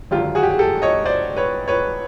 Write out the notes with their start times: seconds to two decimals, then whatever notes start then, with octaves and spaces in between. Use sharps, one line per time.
0.11 G#1 F#2 D3 F4 G4
0.35 F#4 G#4
0.43 G4
0.51 G#4
0.59 G4 A4
0.82 C#5 D#5
1.06 C5 D5
1.36 B4 C#5
1.68 B4 C#5